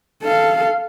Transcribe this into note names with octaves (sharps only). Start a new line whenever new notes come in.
A4 F5